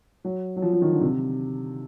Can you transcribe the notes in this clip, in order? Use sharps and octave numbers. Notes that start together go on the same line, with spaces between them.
F#3
F#3
F3
F3
D#3
D3
C3